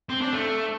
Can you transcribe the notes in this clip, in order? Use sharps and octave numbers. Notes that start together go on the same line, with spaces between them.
C4
D4
A3